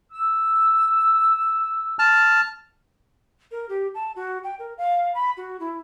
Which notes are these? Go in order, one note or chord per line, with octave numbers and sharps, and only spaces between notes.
E6
A5 F6
A#4
G4
A5
F#4
G5
A#4
F5
B5
F#4
E4